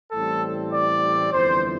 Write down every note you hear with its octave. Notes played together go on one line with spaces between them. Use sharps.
A1 A2 G3 C4 A4
D5
G1 F2 E3 C5